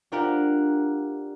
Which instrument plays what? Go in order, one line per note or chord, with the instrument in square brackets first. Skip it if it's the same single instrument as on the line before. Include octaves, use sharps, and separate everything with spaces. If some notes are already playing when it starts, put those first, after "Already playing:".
[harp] D4 F4 G4 A#4 F#5